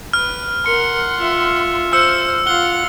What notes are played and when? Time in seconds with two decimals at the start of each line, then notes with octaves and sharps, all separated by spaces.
0.13 B4 F6
0.66 A#4 F#5 C6 C#7
1.17 F4 E5
1.93 C5 E6 F6 C#7
2.47 F4 F5 F#5 G7